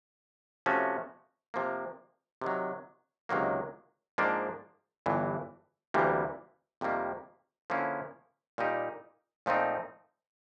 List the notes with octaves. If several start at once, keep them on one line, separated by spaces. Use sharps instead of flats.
C3 F3 A3 C#4 F#4
C3 F3 A#3
C3 D#3 F#3
C#2 C3 D#3 F#3 A#3
G#2 F3 A#3 D4
G1 G2 E3
D2 C3 E3 G3 A#3
F2 C3 D#3 G3 A#3
D3 F3 A#3 C#4 E4
A#2 G3 A#3 D#4 G4
A#2 F3 A3 C4 D#4